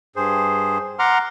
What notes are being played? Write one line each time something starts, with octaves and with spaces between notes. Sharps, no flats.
G2 G#4 C5
F#5 A#5 C6 D6 F6